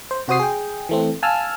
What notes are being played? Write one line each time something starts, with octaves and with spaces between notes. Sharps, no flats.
C5
C3 F#4 C5 D#6 C7
G#4 G5
E3 A3 C4
F5 G#5 A5 E6 F6